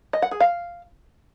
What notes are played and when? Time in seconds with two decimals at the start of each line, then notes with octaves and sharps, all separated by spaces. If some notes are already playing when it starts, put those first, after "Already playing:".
0.13 D#5
0.22 F#5
0.31 G#4
0.40 F5